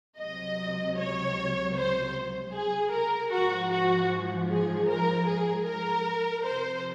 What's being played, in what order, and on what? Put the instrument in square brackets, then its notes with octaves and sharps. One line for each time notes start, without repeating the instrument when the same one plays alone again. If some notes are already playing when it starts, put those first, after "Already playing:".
[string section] C#2 C3 F#3 D#5
C#5
C5
G#4
A#4
G#2 F3 F#4
F#4
G#4
A#4
G#4
A#4
F2 C3 F3 C5